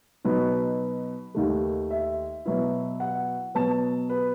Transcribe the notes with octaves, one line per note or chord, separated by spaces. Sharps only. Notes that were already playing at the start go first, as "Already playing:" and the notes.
B2 F#3 B3 D#4 B4
D#2 D#3 A3
E5
B2 F#3 B3 E4
F#5
B2 F#3 B3 A5
B4